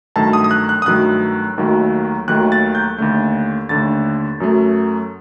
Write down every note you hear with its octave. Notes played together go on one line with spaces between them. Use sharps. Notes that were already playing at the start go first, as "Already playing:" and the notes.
G2 D#3 F#3 A3 A5
D#6
D#6
F#6
F#6
D#6
G2 D#3 F#3 A3 F#6
D#2 D#3 F#3 A3
D#2 D#3 F#3 A3 F#6
A6
G6
D#2 D3 A3
D#2 D3 A3 A6
F#2 F#3 A3